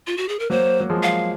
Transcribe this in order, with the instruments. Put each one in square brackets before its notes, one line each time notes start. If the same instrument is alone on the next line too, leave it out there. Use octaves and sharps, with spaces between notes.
[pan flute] F4
F#4
G#4
A#4
[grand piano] F#3 A#3 [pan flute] C5
[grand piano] F#3
F3 G#3
[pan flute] F5